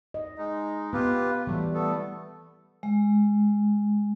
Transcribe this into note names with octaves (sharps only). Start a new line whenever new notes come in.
D#5
G#3 D#4
B3 F4 G4 B4
E3 F#3 G3 A3
A3 B3 A4
G#3